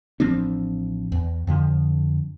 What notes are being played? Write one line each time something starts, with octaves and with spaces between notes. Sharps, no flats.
A1 F3 C4 D4
E2
F2 D3 F3